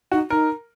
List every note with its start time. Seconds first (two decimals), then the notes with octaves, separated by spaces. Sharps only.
0.12 D#4 F#4
0.30 D#4 A#4